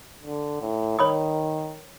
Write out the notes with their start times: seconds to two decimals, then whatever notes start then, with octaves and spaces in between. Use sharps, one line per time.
0.24 D3
0.61 A2
0.99 D#3 C#5 B5 D#6